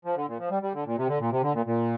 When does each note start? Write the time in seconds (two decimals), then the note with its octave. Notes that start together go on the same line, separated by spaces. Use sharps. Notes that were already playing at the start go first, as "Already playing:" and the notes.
0.05 F3
0.16 D3
0.27 A#2
0.39 F3
0.51 G3
0.63 G3
0.74 D3
0.86 A#2
0.97 C3
1.08 D3
1.20 A#2
1.31 C3
1.43 D3
1.54 A#2
1.66 A#2